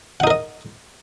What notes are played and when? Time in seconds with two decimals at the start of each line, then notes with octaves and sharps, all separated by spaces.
0.20 F#5
0.24 D#4
0.27 A#4
0.30 D#5